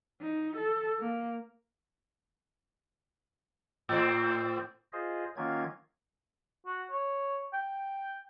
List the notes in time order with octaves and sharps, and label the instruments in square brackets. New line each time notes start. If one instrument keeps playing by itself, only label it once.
[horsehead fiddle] D#4
A4
A#3
[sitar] A2 C4
[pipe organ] F4 G#4 C5 D#5
D#3 F#3 A#3 C#4 F4 G#6
[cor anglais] F#4
C#5
G5